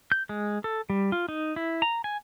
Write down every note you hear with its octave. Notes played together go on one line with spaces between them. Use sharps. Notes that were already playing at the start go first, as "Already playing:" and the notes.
G6
G#3
A4
G3
F4
D#4
E4
A#5
G#5